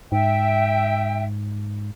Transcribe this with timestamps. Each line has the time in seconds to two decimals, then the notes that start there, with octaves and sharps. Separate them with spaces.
0.12 G#2 E5 G5